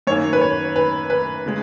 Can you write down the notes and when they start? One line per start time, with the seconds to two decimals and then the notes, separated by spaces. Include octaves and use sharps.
0.07 F#2 D#3 A#3 C#5
0.33 B4
0.41 C#5
0.76 B4
1.10 B4
1.46 C#3 G#3